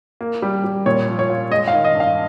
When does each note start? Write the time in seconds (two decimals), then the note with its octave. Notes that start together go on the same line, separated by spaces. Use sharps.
0.21 A#3
0.42 G3
0.64 G3
0.86 A#2 C#5
1.08 F3
1.19 C#5
1.30 F4
1.51 G#3 D#5
1.68 F5
1.73 D#3
1.85 D#5
1.95 G2
2.00 F5